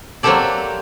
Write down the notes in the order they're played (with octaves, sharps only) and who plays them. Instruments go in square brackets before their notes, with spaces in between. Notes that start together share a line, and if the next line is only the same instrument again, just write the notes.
[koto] F#3 A#3 C4 G4 A4 D5